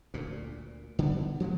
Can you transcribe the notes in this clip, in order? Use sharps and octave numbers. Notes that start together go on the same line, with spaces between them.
D2 A#2
D3 G3 B3
F3 F#3 G#3 B3